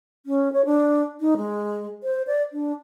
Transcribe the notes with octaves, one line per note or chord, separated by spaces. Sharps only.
C#4
C#5
D4
D#4
G#3
C5
D5
D4